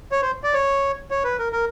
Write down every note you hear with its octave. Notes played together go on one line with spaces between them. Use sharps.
C#5
C5
D5
C#5
C#5
B4
A#4
A#4